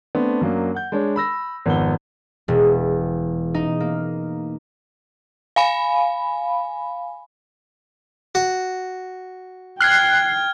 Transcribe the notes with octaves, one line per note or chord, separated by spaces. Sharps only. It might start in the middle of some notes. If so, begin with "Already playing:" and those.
A3 B3 C4 D4
F#2 F#3 A#3 D4
F#5 G6
G#3 D4 C#5
B5 E6 A#6
G#1 F2 B3 F#5 G7
E1
D#4
A#3
F5 G#5 B5
F#4
G5 F6 F#6 G#6 C7